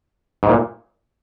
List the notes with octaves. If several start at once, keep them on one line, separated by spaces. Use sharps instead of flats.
G#2
A#2